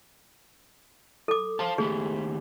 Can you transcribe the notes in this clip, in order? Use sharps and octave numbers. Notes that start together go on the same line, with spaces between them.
A4 D6
C5 F5 A5
D#2 A3 G4 G#4